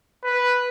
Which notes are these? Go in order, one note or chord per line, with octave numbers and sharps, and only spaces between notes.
B4